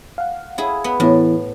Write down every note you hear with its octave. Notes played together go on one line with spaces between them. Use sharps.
F5 F#5
E4 G#4
B3
A2 E3 B3 E4